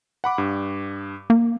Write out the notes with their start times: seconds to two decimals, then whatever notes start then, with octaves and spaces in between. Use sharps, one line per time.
0.24 F#5 B5 D6
0.38 G2
1.30 A#3